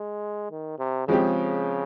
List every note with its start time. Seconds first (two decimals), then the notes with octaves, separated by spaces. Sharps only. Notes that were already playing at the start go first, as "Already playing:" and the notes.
Already playing: G#3
0.51 D#3
0.79 C3
1.08 C#3 F3 G#3 C4 G4